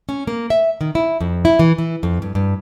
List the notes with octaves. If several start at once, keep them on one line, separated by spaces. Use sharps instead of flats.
C#4
A#3
E5
D#3
E4
F2
E4
E3
E3
F2
G2
G2